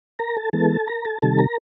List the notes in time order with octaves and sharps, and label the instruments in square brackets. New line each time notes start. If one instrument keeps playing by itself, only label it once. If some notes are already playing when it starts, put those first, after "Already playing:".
[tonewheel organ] A#4 A#5
A4 A5
E3 G#3 B3 A4 A5
A#4 A#5
A4 A5
C3 D#3 G3 A4 A5
A#4 A#5